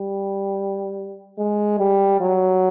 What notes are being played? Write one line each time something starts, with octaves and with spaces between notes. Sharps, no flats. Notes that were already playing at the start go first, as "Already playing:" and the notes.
Already playing: G3
G#3
G3
F#3